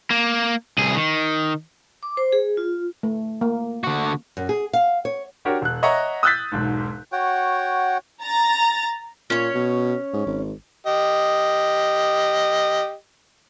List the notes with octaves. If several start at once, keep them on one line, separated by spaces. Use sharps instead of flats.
A#3
C2 G#4
D#3
D6
C5
G#4
F4
A3
A#3
D3 F#4
F#2
G#4
F5
C#5
D4 F#4 G4 A#4 C#5
E1 F#6
C#5 D#5 E5 F#5 A#5 C#6
D#6 E6 F#6 G6 A6 B6
E1 B1 G#2
F#4 C#5 F#5 G5
A#5 A6
A#2 C#4 C#5
B2
G#2
G#1
G4 D#5